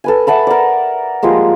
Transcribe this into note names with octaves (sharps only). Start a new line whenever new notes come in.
A4 B4 G#5
E5 F#5 A5 B5
A#4 D5
F3 G3 G#3 A#3